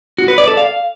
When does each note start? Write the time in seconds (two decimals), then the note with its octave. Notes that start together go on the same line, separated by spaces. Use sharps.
0.18 F#4
0.28 B4
0.38 D5
0.48 A4
0.57 F5